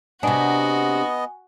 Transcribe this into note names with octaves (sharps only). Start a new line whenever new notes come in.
C3 B3 D4 F#4 D#5 G#5